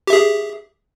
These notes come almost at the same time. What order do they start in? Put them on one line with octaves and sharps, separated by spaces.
G4 E5 G#4